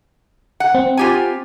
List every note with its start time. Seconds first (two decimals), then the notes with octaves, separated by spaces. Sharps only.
0.60 F#5
0.75 C4
0.97 F4 G4 G#5